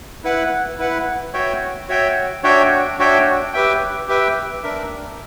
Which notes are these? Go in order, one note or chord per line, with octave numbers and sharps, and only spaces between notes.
E4 B4 F#5
E4 B4 F#5
F#4 C#5 E5 G5
F#4 C#5 E5 G5
D4 F#4 C#5 E5 G5
D4 F#4 C#5 E5 G5
G4 B4 E5 G5
G4 B4 E5 G5
D4 A#4 E5